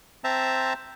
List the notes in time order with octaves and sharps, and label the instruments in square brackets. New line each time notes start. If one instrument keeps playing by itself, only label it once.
[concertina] C4 C5 E5 A5 A#5